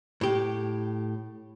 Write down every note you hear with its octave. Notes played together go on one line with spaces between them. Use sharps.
A2 G4